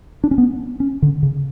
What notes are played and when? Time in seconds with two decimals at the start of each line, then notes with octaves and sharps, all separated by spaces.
0.24 D4
0.31 C#4
0.38 B3
0.80 C#4
1.02 D3
1.23 C#3